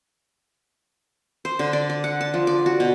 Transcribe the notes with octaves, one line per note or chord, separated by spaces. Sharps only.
C5
D3
D5
D5
F#5
A5
F3
D5
F#4
B2